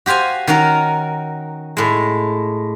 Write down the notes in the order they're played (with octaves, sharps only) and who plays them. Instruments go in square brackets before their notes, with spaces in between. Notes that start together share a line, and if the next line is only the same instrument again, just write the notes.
[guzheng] F#4 G4 C5 F5 G#5
D#3 C#4 F#4 A#4
A2 G#3